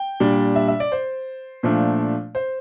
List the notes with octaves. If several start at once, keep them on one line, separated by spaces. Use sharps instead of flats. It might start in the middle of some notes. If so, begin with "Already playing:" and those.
Already playing: G5
A#2 G3 D4
E5
E5
D5
C5
A#2 F3 A3 D4
C5